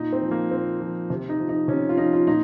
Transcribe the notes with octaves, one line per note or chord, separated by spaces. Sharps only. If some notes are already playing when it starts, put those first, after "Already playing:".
Already playing: A#2 D#4
C4
F3
A#3
A#2 C4
F3
C3
D#4
F3
D#4
C3 C#4
F4
F3 D#4
F4
A#2 D#4